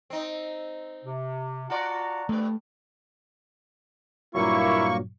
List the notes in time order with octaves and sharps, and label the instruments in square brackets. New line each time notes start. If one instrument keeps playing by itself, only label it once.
[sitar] C4 D#4
[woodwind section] C3
[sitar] F4 F#4 D5 [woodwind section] F#5 A5 A#5
[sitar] G2 B3 [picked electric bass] A3
[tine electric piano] G2 A#2 F#3 [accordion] A#3 C#6 [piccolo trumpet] E4